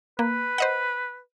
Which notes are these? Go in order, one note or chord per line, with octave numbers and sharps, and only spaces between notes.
A#3 B4
C5 D#5 F#5